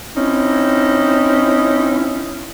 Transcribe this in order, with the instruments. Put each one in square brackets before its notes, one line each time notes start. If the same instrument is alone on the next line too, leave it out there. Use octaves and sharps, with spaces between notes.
[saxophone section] C4 C#4 D#4 E4